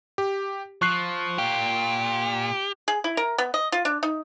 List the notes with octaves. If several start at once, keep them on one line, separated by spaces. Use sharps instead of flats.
G4
F3 C#6 F#6 C7
A#2 G4 F5
G#4
E4
A#4
B3
D#5
F4
D4
D#4